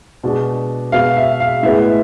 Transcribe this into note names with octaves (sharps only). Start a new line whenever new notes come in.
B2 G#3 D4
B2 G#3 B3 F5
E5
F5
A2 G#3 B3 E4 E5